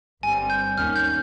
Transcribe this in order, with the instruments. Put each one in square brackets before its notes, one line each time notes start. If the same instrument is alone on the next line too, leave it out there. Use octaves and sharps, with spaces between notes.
[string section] G1 G2 G3 C4 [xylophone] G#5
[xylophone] G6
[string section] D#2 D#3 A#3 C#4 [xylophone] F6
[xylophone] G6